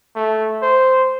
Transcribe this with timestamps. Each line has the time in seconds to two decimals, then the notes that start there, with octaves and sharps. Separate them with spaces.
0.16 A3
0.62 C5